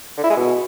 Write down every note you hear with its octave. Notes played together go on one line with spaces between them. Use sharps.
D3
E4
G#3
B2